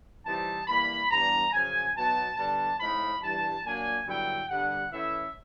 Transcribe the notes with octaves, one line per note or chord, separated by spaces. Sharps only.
C3 E3 G3 C4 D#4 A5
E3 G3 A#3 D4 B5
G2 E3 G3 B3 D4 A#5
F#2 C#3 F3 G#5
B2 F#3 B3 D#4 A5
D3 G3 B3 D4 A5
A2 F3 G#3 C4 D#4 B5
G2 E3 G3 A5
A#2 F#3 A#3 D4 G#5
G2 D3 F#3 B3 E4 G5
G2 D3 G3 B3 D4 F#5
E3 A3 C#4 E4 E5